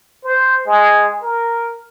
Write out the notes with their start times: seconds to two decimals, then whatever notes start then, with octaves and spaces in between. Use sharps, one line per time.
0.24 C5
0.66 G#3
1.22 A#4